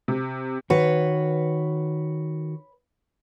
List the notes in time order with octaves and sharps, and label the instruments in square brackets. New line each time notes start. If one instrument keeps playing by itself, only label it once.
[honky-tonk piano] C3
[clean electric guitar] D#3 F#4 [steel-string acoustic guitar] B4 C#5